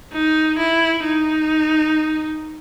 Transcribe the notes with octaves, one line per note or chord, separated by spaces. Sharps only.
D#4
E4
D#4